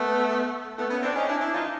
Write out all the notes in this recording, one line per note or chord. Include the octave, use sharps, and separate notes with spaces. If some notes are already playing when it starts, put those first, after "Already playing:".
Already playing: A3 B3
A3 B3
B3 C#4
C4 D4
C#4 D#4
D4 E4
D4 E4
D#4 F4